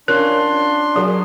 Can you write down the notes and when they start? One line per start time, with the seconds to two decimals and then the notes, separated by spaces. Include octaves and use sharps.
0.08 C#4 D4 F4 A#4 C#5 C6
0.96 F#3 F#4 G#4 A#4